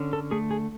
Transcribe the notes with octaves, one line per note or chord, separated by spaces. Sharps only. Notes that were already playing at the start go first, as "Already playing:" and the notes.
Already playing: D3 C#4
A4
A3 G#4
G#4